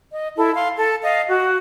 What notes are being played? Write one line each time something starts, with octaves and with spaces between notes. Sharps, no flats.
D#5
E4 A4
F5 C6
A4
D#5 F5
F#4